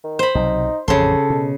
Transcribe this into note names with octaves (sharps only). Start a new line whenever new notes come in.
D#3
C5 B5
B1 C3 F#3 D#4
A1 F2 C#3 A4 C6
B2